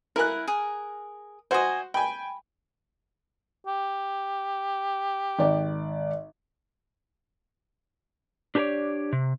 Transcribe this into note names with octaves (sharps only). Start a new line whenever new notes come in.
E4 A#4 F#5 G#5 F#6
G#4
F#4 C5 D#5 G#5
G5 G#5 B5
G4
G#1 D5
D4 G4 G#4 B4 C#5 D5
C3